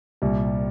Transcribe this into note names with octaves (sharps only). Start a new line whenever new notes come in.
C2 A#2 G3